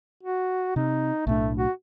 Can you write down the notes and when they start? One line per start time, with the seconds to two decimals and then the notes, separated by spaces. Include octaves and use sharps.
0.23 F#4
0.76 C3 D#4
1.27 B1 A2 A3 D4
1.57 F#4